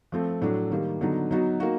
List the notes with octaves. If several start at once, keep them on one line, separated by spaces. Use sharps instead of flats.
F3 A3 C4
A2 F#3 A3 D4
D#3 G3 A#3
D3 F#3 B3 D#4
F#3 B3 D#4 F#4
A#3 D#4 F#4